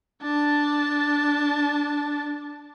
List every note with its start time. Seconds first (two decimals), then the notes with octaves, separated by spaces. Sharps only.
0.22 D4 A5